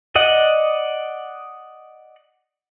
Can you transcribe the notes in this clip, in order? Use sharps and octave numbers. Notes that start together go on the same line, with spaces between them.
D5 D#5 F#5